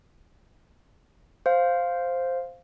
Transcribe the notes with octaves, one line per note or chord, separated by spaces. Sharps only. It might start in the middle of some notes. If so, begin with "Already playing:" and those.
C5 F5